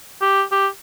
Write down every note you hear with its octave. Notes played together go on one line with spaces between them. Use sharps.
G4
G4